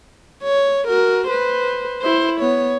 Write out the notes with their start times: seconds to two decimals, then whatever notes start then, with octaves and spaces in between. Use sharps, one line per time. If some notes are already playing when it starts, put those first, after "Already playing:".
0.43 C#5
0.87 F#4 A#4
1.28 B4 C5
2.02 E4 C5
2.40 B3 C#5